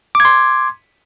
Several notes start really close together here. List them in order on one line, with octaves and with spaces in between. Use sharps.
D6 G#6 C6